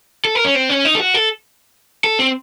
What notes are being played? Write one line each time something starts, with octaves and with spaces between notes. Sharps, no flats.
A4
A#4
C#4
C4
C#4
D#4
A4
F#4
A4
A4
C4